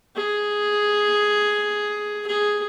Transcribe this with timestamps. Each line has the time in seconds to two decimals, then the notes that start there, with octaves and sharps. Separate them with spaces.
0.16 G#4
2.27 G#4